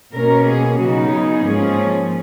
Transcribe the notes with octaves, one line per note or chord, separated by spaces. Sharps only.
B2 A#3 C#4 A#4
G#4
C#3 F#3 B3 D#4 F#4
G#4
G#2 F3 A#3 C#4